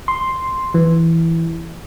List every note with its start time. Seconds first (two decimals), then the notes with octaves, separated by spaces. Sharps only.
0.08 C6
0.74 E3